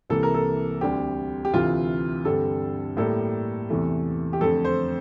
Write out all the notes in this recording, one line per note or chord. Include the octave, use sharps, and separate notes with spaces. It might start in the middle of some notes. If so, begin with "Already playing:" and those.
C2 C3 E3 A#3 A4
A#4
A4
D2 D3 G3 C4 G4
G4
D2 C3 E3 A3 C4 F4
G2 D3 G3 C4 A4
A2 G3 A#3 A4
E2 C3 E3 A3
G4
F2 D3 A3 C4 A4
C5